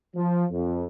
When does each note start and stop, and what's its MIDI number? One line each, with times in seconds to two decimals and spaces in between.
0.15 0.45 53
0.51 0.85 41